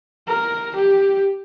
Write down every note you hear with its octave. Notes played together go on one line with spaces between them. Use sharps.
A#4
G4